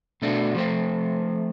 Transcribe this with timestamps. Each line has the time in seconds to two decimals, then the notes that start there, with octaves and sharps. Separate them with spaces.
0.22 B2 A3 D4 F#4
0.54 F3 A3 C4